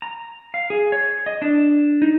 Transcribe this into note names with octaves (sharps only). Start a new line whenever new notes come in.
A#5
F5
G#4
C#5
D#5
D4
D#4